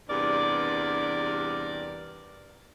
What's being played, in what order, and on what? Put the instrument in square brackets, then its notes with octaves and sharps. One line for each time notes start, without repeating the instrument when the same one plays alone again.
[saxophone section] E2 G2 C3 A#4 D5